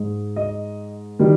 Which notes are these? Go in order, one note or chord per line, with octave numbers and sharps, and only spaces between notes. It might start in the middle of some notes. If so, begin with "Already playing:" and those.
Already playing: G#2 G#3
D#5
D#3 G3